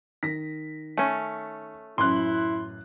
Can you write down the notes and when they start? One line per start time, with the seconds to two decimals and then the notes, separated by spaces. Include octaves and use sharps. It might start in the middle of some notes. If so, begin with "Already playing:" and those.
0.23 D#3 A#6 B6
0.97 A3 C#4
1.98 A1 F#2 E4 C6 F#6